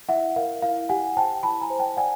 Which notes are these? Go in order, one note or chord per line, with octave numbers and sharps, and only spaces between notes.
E4 E5 F#5
A#4 F5
E4 F5
G4 F#5 G#5
C5 G5 A5
E4 A5 B5
G#5 A#5
C5
G5 A5
D5 F#5 G#5